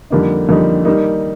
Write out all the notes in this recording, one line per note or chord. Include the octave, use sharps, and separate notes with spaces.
F2 D3 G3 A#3 D#4
F2 D3 G3 A#3 D#4
D#3 G3 A#3 D#4